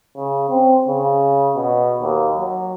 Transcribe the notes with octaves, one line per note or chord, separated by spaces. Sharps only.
C#3
C4
C#3
B2
D#2
F#3